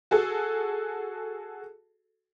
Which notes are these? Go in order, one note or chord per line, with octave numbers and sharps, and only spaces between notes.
F#4 G#4 A4